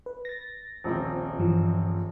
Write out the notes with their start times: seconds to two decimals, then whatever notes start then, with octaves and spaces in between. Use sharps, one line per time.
0.06 B4
0.25 A6 A#6
0.84 D#1 A#1 C4
1.39 G2 E3 F3